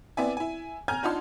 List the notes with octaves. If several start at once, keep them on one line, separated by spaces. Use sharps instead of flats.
B3 C4 E4 D5 E5 G#5
E4 G#5
G#5 A#5 F6 G6 G#6
D4 D#4 F4 F#5 A5 C6